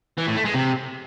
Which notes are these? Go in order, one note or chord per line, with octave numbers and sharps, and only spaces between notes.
E3
A2
A3
G#3
C3